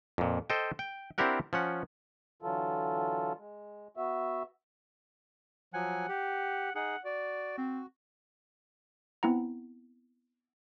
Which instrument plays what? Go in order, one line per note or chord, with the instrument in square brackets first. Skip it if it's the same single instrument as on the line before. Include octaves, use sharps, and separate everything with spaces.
[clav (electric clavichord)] F2 A#2
A4 C5 D#5 G5
G5
C4 D4 E4 G4 A#4 F#5
F3 C#4 F#5
[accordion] D3 E3 F#3 F4 A4
G#3
B3 F#4 E5
[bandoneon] F3 F#3 G#5 [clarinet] F#5
[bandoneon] G4
[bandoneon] D#4 G#4 [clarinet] F#5
[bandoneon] F#4 [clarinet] D5
[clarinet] C4
[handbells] B3 C4 E4 F#5 A#5